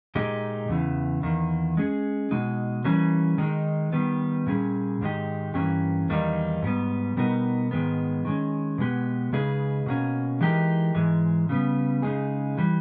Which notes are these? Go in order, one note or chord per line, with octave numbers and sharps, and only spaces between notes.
A#2 G#3 D#4 G4
E2 C#3 E3
E2 D#3 A#3
G#3 C#4 G#4
B2 G#3 D#4
E3 G3 A#3 C#4
D#3 G#3 D#4
D#3 G3 B3
A#2 G3 C#4 G#4
G#2 D#3 G#3 D#4 G4
G2 E3 A#3 C#4 G4
E2 D#3 G3 A#3 D#4
G#2 G3 B3
B2 G3 B3 D#4 A#4
G#2 D#3 G#3 B3
D#3 G#3 C#4
B2 G#3 B3 G4
C#3 G#3 D#4 G#4 B4
B2 A#3 C#4
E3 G#3 D#4 G4 A#4
G#2 E3 G#3
C#3 G3 B3
C#3 G#3 D#4 G#4
E3 G3